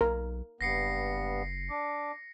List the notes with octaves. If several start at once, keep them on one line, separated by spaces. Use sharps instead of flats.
B1 A#4
F#1 G2 B3 A#6 C7 C#7
D4 D6